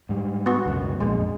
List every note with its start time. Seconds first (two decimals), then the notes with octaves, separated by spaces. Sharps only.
0.09 G#2 G3
0.46 B3 F#4
0.66 C#2 F#2 B2
1.00 A#1 F2 A#2 G#3